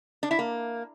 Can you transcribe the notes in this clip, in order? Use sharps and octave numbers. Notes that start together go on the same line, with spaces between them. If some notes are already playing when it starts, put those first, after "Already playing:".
D4
E4
A#3